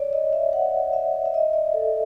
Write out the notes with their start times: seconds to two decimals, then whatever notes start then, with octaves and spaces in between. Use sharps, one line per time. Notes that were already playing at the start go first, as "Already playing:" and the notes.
Already playing: C#5 D5
0.13 D#5
0.33 E5
0.53 F#5
0.93 E5
1.26 E5
1.34 D#5
1.53 D5
1.74 A4